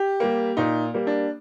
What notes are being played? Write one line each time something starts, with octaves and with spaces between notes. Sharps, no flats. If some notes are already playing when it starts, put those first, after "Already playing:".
Already playing: G4
G3 A#3
A#2 D#4
G3 A#3
D4